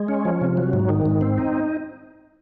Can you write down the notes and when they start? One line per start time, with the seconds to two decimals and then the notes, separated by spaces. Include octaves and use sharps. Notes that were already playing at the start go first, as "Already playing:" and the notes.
Already playing: G#3
0.08 C#4
0.25 F3
0.41 C3
0.57 F#3
0.73 G#2
0.89 D#3
1.05 G#2
1.21 C4
1.38 D#4